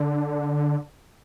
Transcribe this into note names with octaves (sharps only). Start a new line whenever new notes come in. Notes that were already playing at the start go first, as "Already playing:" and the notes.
Already playing: D3